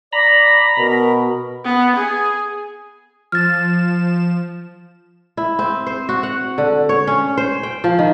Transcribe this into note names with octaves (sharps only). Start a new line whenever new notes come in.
D5 A#5 B5
B2 A#4
B3
G#4
F3 F6 A6 E7
E4
C4
C5
F#4
F#5
D3
C#5
C#4
C5
G5
F3
D#3